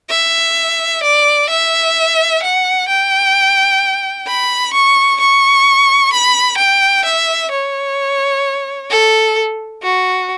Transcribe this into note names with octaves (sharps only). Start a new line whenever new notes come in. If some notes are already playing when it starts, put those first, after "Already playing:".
E5
D5
E5
F#5
G5
B5
C#6
C#6
B5
G5
E5
C#5
A4
F#4